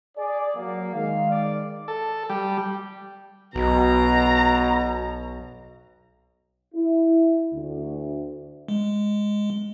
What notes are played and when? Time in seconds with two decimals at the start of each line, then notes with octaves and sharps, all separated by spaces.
0.18 G#4 D5
0.56 F#3 A#3
0.94 D#3 G#3 F5
1.30 D5
1.88 A4
2.29 G3
3.55 B1 B2 A#5
6.74 E4
7.54 D2
8.68 G#3